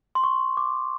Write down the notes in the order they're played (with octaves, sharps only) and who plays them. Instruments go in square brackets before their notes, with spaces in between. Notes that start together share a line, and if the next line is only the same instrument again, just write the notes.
[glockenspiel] C6
C#6
D6